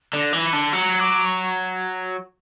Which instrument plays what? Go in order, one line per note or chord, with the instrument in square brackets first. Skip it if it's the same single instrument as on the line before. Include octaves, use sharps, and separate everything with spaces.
[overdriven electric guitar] D3
[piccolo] A#6
[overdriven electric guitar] E3
[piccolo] C#7
[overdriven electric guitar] D3
[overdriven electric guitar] F#3 [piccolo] C#7
[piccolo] D6
C#6